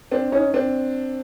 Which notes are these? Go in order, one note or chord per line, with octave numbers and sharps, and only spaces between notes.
C4 D4
C#4 D#4
C4 D4